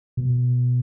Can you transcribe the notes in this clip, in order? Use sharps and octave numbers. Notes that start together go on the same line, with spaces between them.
B2